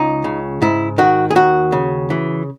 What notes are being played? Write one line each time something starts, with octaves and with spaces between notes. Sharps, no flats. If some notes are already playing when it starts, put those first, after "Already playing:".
Already playing: C#2 D#4
C#3
G#2 E4
D#3 F#4
G#4
D#2 F#4
C#3
E3